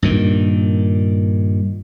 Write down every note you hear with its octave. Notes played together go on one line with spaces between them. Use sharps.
G2 A#2 D#3